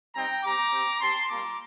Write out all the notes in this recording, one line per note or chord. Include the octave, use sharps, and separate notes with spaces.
G3 C4 D#4 G5 A#5
G3 C4 G4 A#5 D6
C4 G4
C4 G4 A5 C6
G3 A#3 F4 A#5 D6